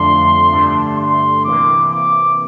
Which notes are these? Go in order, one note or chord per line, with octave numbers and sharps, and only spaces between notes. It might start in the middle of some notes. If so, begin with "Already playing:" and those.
Already playing: F2 D3 F3 A3 D4 C6
G2 D3 A3 D4
C6
C3 E3 A#3 D6
D6